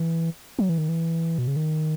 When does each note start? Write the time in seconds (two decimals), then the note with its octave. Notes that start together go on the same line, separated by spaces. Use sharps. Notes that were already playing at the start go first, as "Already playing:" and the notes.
Already playing: E3
0.59 F#3
0.69 E3
0.78 D#3
0.89 E3
1.38 B2
1.47 C#3
1.56 D#3